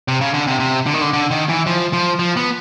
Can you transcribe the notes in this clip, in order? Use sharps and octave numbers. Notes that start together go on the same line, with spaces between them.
C3
C#3
D3
C3
C3
D3
D#3
D3
D3
D#3
E3
F3
F3
F3
B3